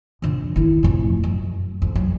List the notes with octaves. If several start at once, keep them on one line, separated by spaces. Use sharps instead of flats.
F2 D3
D#3 E4
F2 A2
F#2
F2
F#3